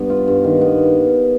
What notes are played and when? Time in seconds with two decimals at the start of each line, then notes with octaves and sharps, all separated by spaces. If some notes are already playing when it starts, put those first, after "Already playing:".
Already playing: G2 B3
0.10 F4
0.28 G2
0.44 D#3
0.61 B3